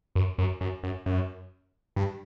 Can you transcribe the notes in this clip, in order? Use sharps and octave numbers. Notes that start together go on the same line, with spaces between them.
F#2
F#2
F#2
F#2
F#2
G2